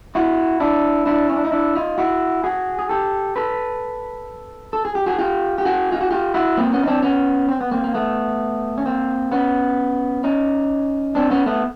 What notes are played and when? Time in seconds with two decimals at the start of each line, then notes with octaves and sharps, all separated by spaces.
0.15 E4 F#4
0.60 D4 E4
1.06 D4 E4
1.29 C#4
1.37 D4
1.45 D#4
1.52 D4 E4
1.75 D#4 F4
1.98 E4 F#4
2.44 F#4 G#4
2.79 G#4
2.89 G4 A4
3.36 A4 B4
4.73 A4
4.85 G#4
4.95 G4
5.06 F#4 G#4
5.19 F4 G4
5.58 G4
5.65 F#4 G#4
5.92 F4
6.01 F#4
6.11 F4 G4
6.34 E4 F#4
6.57 A#3 C4
6.72 B3 C#4
6.83 D#4
6.88 C4 D4
7.03 B3 C#4
7.49 C4
7.61 B3
7.71 A#3 C4
7.84 A#3
7.94 A3 B3
8.78 C#4
8.86 A#3 C4
9.32 B3 C#4
10.24 C#4 D#4
11.15 C4 D4
11.31 B3 C#4
11.46 A3 B3